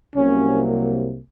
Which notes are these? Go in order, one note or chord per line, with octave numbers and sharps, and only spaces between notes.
C2 C3 F#3 A#3 C#4